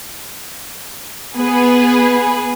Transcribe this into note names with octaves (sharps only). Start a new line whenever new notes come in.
B3 G#4 B4